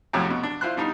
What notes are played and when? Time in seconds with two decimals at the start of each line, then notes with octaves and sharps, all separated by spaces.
0.13 F2 A2 C3 F#3
0.30 B2
0.43 D4
0.61 E4 F4 C5 C6 F#6
0.77 B2 G3 D4 D#4